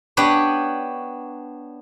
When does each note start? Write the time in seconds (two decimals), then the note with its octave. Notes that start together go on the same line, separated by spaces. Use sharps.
0.17 B3 D4 G4 B4 C#5